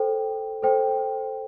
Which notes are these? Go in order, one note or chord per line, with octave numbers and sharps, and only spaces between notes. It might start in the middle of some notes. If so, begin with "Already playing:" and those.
Already playing: A4 C5 G5
A4 C5 G5